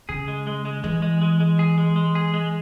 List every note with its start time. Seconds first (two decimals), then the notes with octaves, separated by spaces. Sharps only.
0.09 C#3 G#4
0.28 G#3
0.47 G#3
0.65 G#3
0.84 E3 G#3
1.02 G#3
1.22 G#3
1.40 G#3
1.59 G#4
1.78 G#3
1.96 G#3
2.15 G#4
2.34 G#3